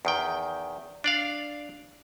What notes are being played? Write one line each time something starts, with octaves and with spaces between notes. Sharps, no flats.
E2 D#3 G5
D4 D5 F5